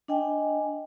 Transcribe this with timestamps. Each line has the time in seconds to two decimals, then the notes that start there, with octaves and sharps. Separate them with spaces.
0.08 D4 D#5 G5 G#5